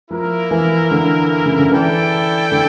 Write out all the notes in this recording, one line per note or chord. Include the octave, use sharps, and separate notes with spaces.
F3 A#3 E4 A#4
E3
D3
C#3
D3
E3 E4 A4 D5 G5
D3